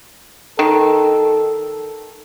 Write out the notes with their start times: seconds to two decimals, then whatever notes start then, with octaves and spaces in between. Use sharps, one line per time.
0.59 D#3 A4